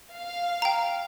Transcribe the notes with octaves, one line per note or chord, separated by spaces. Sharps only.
F5
G5 A#5